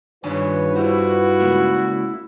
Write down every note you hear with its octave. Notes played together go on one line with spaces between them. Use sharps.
G2 D#3 D4 F4 B4 C#5 G#5
G3 E4 F#4 C5
C#3 G#3 A#3